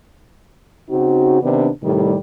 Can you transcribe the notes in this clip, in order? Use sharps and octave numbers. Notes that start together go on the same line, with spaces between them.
C#3 C4 D#4 F#4
C3 D#3 B3 D4
A2 C3 D#3 G3